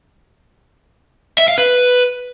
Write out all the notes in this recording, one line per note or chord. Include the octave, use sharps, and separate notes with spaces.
E5
F5
B4